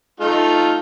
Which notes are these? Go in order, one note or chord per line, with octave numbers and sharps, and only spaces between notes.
A3 D#4 F4